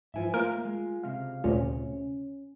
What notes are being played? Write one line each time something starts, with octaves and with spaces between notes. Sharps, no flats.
G#2 E3 F3 E5 G#5
A3 A#3 F4 A#4 A#5
G#3
C#2 C3 F5
D2 A#2 C#4